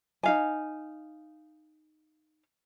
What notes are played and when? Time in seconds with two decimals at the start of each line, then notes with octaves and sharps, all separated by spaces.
0.23 D#4 F5 G#5